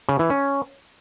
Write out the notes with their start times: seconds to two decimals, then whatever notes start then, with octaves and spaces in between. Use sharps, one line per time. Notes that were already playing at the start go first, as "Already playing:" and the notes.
0.09 C#3
0.19 E3
0.30 C#4